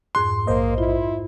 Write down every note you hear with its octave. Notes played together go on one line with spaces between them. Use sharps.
F2 G#2 C6 F#6
A#1 A#3 C5 D#5
E4 F4